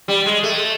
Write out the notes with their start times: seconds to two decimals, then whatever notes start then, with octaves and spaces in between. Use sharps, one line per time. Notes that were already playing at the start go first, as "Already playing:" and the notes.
0.08 G3
0.26 G#3
0.43 A3